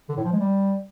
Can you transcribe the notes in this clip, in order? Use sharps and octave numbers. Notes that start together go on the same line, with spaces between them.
D3
A2
F3
G#3
G3